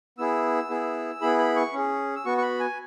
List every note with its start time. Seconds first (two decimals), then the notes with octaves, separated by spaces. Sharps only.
0.18 B3 E4 G#4 E6
0.70 B3 E4 G#4
1.21 B3 E4 G#4 B5
1.39 B5
1.56 C#6
1.73 C#4 G#4
2.16 E6
2.25 B3 F#4 C#6
2.38 C#6
2.42 B5
2.60 G#5